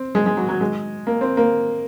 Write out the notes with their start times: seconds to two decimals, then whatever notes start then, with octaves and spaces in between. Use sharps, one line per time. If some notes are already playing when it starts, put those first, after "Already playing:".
Already playing: C4
0.15 G#3
0.26 G#3
0.37 F#3
0.49 F#3
0.61 G#3
1.07 A#3
1.21 C4
1.37 A#3